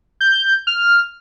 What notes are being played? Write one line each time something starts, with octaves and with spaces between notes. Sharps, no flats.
G6
F6